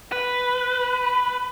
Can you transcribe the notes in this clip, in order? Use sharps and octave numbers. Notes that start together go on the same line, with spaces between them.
B4